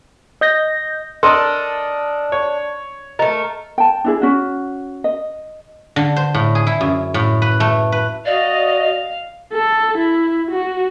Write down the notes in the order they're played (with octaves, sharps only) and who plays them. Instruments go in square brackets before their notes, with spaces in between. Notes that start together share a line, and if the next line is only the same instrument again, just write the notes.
[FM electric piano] D#5 G6 A#6
[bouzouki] D4 [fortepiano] A4 A#4 D#5 [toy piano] C6
[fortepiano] C#5
[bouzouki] A3 A#4 [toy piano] D#5
[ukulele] G5 A5
D4 E4 G#4
C#4 F#4
D#5
[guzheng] D3
C5
A2
G#4
E4
F#2
A2
B4
A3
B4
[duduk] F#4 [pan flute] D5 [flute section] D#5 [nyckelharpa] F5
[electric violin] A4
E4
F#4